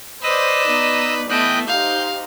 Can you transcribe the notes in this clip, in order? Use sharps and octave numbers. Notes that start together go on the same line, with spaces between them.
B4 C5 D5 D#5 E6
B3 D#4
E3 A3 B3 D#5 G5 F#6
D#4 G4 C5 F5 G6